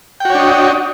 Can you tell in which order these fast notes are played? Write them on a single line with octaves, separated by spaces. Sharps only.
G5 F#4 C#5 D4 D#5